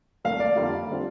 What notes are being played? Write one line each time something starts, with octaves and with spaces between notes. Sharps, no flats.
C2 A#2 F3 A3 F5
D5
F2 D3 G3 A#3 F4
D3 G3 C4 F4